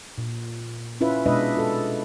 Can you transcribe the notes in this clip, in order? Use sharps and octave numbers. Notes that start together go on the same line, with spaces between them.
A#2
C#4 E4 F4 B4 E5
B2 G#3 D4 B4 D#5 E5
F4 A4